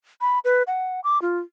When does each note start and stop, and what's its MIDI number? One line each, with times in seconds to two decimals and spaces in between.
0.21 0.39 83
0.45 0.63 71
0.67 1.00 78
1.04 1.21 86
1.22 1.39 65